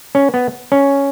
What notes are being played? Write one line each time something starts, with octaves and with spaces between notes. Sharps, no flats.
C#4
B3
C#4